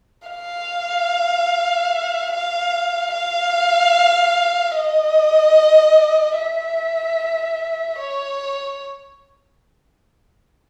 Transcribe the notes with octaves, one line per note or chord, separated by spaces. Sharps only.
F5
F5
F5
D#5
E5
C#5